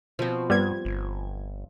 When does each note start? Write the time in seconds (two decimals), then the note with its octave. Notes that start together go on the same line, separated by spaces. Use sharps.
0.19 B2 F3 C4
0.50 G2 G3 B3 G#6
0.85 G1